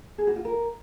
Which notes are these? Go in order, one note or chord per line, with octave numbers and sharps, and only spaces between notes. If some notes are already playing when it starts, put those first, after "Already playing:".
G#4
F#4
F4
A#4